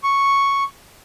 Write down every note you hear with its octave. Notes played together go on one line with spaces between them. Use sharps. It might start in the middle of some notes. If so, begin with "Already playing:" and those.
C#6